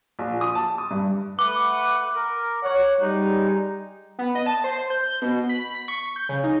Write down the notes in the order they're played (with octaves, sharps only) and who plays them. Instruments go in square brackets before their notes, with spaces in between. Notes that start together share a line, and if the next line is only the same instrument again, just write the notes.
[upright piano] A#1
D#6
A5
D#6
G2
[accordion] A3 B4 F#5 [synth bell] D6
[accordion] A#4
[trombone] C#5 [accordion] F#5
[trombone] G3 [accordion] G#3 D#4
[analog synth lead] B3
D#5
A5
C5
G6
B2
B5
B6
C#6
G6
C#3
D#4